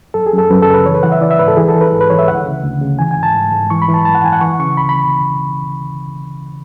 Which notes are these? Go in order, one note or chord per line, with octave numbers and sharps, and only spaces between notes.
F#2 A4
G#4
F#2
A4
F#2 B4
A4
C#3
B4
E3 C#5
B4
E3 F#5
E5
E3 D5
E5
G#2 B4
A4
E3 G#4
A4
E3
B4
G#2
B4
E3 C#5
E5
D2 F#5
C#3
D2
C#3
E3 G#5
G#5
G#2
A5
G#2
G#2
E3 C#6
B5
E3
A5
F#2 A5
F#5
E3 G#5
F#5
E3 C#6
C#3 C#6
D2 B5
B5